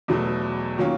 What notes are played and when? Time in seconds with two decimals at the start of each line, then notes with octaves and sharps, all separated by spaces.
0.08 E2 B2 F#3 A3
0.78 D#3 F#3 A#3 C#4 F4